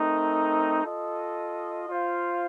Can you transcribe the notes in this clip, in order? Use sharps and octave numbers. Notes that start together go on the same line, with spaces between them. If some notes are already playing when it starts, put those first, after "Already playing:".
Already playing: A3 C4 D#4 A#4
F4 A4 D#5
F4 C5 F5